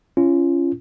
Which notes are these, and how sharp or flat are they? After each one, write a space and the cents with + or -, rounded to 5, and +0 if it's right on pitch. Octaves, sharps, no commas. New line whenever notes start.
C#4 +0 F4 -35